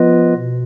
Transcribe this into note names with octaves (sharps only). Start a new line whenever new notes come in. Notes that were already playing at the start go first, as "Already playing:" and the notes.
Already playing: F3 B3 F4 B4 D#5
B2